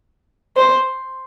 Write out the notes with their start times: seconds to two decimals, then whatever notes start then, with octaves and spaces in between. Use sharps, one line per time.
0.57 C5